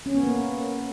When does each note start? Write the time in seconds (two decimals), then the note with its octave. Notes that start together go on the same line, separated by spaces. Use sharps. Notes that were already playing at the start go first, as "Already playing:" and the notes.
0.06 C#4
0.15 B3
0.23 A#3